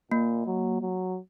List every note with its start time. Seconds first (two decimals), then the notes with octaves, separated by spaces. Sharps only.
0.11 A#2 A#3
0.46 F#3
0.81 F#3